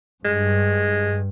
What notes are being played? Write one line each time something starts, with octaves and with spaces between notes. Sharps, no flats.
G2 G#3